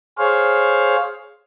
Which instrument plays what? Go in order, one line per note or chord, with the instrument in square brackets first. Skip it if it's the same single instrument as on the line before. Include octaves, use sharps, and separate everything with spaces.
[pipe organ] G#4 C5 C#5 F5